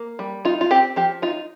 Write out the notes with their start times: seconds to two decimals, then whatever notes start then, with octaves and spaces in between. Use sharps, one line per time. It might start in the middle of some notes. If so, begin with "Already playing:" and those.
Already playing: A#3
0.19 G3
0.45 D#4 F4
0.61 F4
0.71 C4 G4
0.96 F3 G4
1.22 D#4 F4